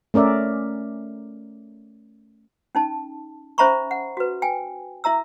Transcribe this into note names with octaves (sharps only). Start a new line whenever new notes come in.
A3 C#4 A#4 D5 E5
C#4 D#4 A5
C#4 C5 E5 A#5 B5 C#6
F#5
F#4 B4
G5 G#5
E4 E5 A#5 E6